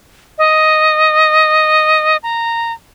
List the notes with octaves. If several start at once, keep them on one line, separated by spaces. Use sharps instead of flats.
D#5
A#5